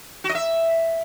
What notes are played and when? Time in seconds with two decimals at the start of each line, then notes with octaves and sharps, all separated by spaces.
0.24 F#4
0.30 D#5
0.35 E5